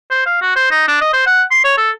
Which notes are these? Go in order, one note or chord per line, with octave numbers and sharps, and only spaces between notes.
C5
F5
F#4
C5
D#4
D4
D#5
C5
F#5
C6
C#5
A4